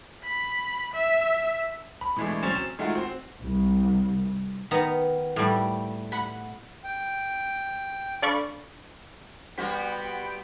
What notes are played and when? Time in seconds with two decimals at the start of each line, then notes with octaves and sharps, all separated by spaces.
0.24 B5
0.94 E5
2.01 B5
2.16 B2 E3 G#3 A3 D4
2.43 F#3 C4 C#4 C5 A6 E7
2.55 E7
2.78 D#3 G#3 A3 D#4 F4 F#4
2.95 C4 F#4
3.43 C2
4.71 D#3 B3 A#5
5.36 A2 G3
6.12 F#5 B5
6.84 G5
8.22 D4 A4 D5 F5 B5 C#6
9.58 G3 B3 F#4 C5 G5 B6